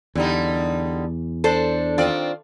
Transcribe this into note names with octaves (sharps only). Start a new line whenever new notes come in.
E2 D3 G3 D#4
D4 A4 C5
D#3 C4 F4 D5